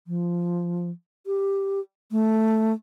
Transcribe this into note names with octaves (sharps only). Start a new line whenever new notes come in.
F3
G4
A3